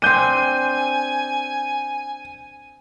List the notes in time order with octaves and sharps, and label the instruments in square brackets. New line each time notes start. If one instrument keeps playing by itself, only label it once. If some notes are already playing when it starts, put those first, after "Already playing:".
[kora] C4 D4 [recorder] G#5 [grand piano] G6 D#7